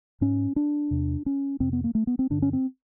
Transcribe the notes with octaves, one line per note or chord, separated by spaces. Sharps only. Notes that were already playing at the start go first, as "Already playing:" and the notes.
G#2 C#4
D4
E2 C3
C#4
F2 C3 C4
B3
A#3
A3
B3
C4
G2 D3 D4
C#4
C4